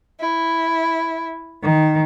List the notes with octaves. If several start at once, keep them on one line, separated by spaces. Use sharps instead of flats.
E4
D#3